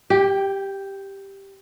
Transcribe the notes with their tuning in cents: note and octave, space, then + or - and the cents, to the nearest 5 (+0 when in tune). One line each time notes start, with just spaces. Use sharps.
G4 +0 G5 +35